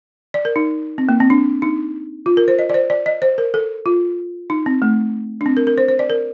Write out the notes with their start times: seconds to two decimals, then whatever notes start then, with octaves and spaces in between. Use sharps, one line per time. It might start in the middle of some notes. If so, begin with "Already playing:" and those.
0.34 D5
0.45 A#4
0.56 D#4
0.98 C4
1.09 A#3
1.20 C4
1.30 D4
1.62 D#4
2.26 F4
2.37 A#4
2.48 C5
2.59 D#5
2.69 D5
2.74 C5
2.90 D5
3.06 D#5
3.22 C5
3.38 A#4
3.54 A4
3.86 F4
4.50 D#4
4.66 C4
4.82 A3
5.41 D4
5.46 C4
5.57 A#4
5.67 A#4
5.78 C5
5.88 C5
5.99 D5
6.10 A#4